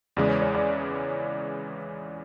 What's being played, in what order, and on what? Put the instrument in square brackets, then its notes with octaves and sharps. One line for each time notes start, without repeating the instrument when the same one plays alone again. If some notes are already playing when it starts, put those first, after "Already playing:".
[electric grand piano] E2 C#3 E3 G#3 [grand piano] D5
[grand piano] C#5
C#5
D5